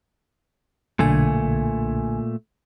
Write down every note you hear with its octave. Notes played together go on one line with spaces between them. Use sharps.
B1 A#2 D3 A3 G#5